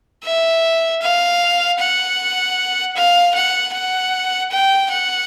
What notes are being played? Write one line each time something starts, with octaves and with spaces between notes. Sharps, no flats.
E5
F5
F#5
F5
F#5
F#5
G5
F#5